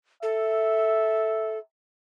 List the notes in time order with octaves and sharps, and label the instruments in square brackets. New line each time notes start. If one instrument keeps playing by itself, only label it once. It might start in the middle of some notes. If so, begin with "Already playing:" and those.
[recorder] A4 [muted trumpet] E5